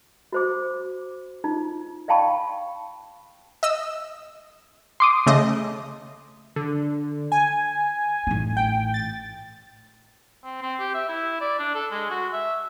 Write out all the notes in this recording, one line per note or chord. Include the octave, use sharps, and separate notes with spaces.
F#4 C5 D6
D#4 F4
D5 F5 G5 A5 B5 C#6
D#5 E6
C6 D6 D#6
C#3 A3 D#5
D3
G#5
A1 D#4
G5
A6
C4
C4
G4
E5
E4
D5
D4
A4
G#3
F#4
E5